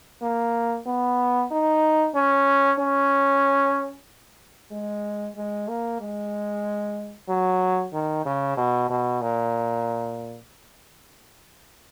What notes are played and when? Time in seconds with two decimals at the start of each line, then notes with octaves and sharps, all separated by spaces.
0.22 A#3
0.86 B3
1.51 D#4
2.15 C#4
2.79 C#4
4.71 G#3
5.36 G#3
5.68 A#3
6.00 G#3
7.28 F#3
7.93 D#3
8.25 C#3
8.57 B2
8.90 B2
9.22 A#2